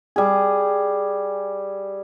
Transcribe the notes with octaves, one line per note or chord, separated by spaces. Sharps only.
G3 G#4